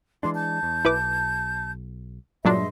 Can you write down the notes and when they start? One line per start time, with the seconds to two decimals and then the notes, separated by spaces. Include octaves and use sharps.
0.23 E3 G#3 D4 C6 D6
0.35 A5 G6
0.63 E2
0.85 B1 E4 B4 D6
2.45 G2 A#2 F#3 G#3 D4 D#5 E5 C6